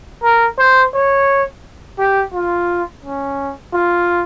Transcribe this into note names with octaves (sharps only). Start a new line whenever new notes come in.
A#4
C5
C#5
G4
F4
C#4
F4